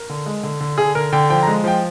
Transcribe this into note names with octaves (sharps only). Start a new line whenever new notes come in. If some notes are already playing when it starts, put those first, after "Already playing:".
Already playing: A#4
D3
G#3
D3
D3
D3 G#4
D3 A#4
D3 G5
F3 G5
A#5
G#3
F3 G5